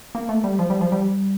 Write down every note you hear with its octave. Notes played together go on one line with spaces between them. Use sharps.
A#3
A3
G3
F3
G3
F3
G3